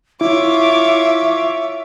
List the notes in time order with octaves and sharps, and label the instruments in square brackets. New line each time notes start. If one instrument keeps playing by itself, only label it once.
[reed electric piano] E4 [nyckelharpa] F4 C#5 [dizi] E5 [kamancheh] D6